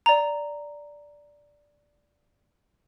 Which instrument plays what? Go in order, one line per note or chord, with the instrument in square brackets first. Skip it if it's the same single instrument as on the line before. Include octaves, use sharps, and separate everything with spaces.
[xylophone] D5 A#5